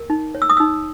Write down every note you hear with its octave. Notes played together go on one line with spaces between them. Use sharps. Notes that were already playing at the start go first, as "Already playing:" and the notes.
Already playing: A#4
D#4
C#5
E6
D#6
D#4 E6